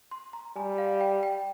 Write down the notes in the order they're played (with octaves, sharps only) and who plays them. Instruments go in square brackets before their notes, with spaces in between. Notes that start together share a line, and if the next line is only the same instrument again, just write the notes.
[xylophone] C6
A#5
[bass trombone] G3 [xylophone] G#5
[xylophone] F5
G5
G5